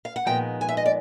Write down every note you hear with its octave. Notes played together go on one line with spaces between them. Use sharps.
F5
F#5
A#2 F3 G#3 B3 D#4 G5
G#5
E5
D#5
D5